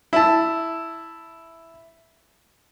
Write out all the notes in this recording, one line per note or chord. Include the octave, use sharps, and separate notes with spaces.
E4 A5